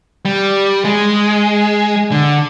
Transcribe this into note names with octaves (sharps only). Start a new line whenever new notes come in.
G3
G#3
D3